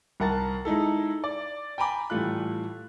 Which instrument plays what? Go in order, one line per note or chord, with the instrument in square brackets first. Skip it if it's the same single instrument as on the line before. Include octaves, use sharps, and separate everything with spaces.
[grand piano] C2 A#4 F#5 A5 A6
G#3 D#4 E4 A4
D5
G5 G#5 A#5 B5 D6
A2 E3 G3 A3 F4 F#6